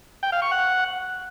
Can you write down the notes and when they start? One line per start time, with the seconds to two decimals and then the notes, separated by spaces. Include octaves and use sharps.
0.23 G5
0.32 F5
0.42 C#6
0.51 F#5